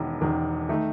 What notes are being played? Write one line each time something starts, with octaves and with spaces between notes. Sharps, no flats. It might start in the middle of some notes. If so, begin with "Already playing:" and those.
Already playing: E1 E2 D#3
E1 E2 D#3
D#3 A3 D#4